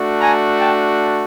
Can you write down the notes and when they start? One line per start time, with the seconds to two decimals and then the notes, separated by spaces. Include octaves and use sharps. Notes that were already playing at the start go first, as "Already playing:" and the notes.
Already playing: A3 D4 F#4
0.19 G#5 A#5
0.59 G5 A5